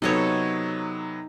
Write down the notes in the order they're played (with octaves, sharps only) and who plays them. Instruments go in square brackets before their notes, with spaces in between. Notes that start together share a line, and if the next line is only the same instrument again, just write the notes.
[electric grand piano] C3 F#3 B3 [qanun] D#4 A4 C#5